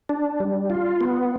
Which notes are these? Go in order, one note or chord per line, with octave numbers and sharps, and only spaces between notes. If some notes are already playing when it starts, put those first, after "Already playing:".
D4
G3
F4
B3